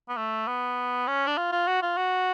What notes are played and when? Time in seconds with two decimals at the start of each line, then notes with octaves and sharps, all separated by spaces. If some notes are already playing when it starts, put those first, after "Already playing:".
0.09 B3
0.17 A3
0.47 B3
1.08 C#4
1.27 D4
1.38 F4
1.52 F4
1.67 F#4
1.82 F4
1.97 F#4